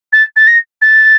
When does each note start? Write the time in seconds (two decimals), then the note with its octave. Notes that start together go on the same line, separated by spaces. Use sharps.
0.12 A6
0.36 A6
0.47 A#6
0.81 A6